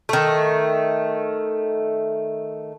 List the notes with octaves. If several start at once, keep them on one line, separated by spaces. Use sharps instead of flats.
D#3 A3